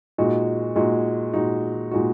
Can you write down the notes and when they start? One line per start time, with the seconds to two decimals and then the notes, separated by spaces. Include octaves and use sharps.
0.18 A#2 G#3 D#4 F#4
0.76 A#2 G#3 D#4 F#4
1.33 A#2 G#3 D#4 F#4
1.91 A#2 G#3 D#4 F#4